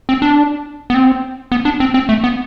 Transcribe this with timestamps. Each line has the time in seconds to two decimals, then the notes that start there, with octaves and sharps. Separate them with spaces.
0.09 C4
0.22 D4
0.90 B3
0.94 C4
1.52 B3
1.65 D4
1.80 C4
1.94 C4
2.09 A3
2.24 B3